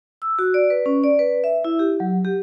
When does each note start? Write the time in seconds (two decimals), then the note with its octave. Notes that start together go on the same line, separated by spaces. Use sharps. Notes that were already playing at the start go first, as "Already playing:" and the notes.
0.22 E6
0.39 F#4
0.54 D5
0.70 B4
0.86 C#4
1.04 D5
1.19 B4
1.44 E5
1.65 E4
1.79 G4
2.00 F#3
2.25 G4